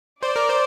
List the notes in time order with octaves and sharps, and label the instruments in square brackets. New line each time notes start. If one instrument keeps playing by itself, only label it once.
[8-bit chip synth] C5 [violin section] D5
[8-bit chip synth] A#4
C5